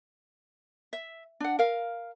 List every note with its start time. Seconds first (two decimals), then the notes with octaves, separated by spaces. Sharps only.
0.93 E5
1.40 D4 F#5
1.59 A#4 F5